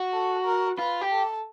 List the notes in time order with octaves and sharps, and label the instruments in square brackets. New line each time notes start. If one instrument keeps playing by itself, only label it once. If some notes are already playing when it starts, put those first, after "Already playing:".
Already playing: [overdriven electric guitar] F#4
[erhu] A4
A#4
[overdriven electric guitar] F4 [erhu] B4
[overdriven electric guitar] G4
[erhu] A4